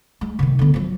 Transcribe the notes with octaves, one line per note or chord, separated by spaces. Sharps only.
G#3
C3 D#3
D3 B3
F3 F#3